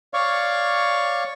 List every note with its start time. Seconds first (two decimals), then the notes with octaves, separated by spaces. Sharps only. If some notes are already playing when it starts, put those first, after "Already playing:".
0.14 C#5 D5 F5 C#6